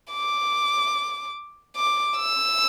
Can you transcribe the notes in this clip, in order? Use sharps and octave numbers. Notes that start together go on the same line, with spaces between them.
D6
D6
E6